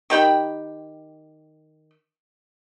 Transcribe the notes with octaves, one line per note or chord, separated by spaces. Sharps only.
D#3 G4 G5 B5